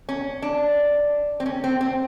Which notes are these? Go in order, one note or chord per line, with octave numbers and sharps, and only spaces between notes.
C#4
D4
C4
C#4
C4
C4